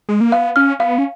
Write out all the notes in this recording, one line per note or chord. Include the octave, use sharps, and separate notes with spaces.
G#3
A#3
B3 F5
C#4 F6
B3 F5
C#4